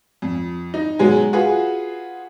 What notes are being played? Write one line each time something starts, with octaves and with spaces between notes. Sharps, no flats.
F2
D#4
B2 F#3 G#3 G#5
F4 F#4 G#4 B4